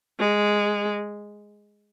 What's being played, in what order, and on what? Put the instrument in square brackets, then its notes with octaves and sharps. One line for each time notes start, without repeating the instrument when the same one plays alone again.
[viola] G#3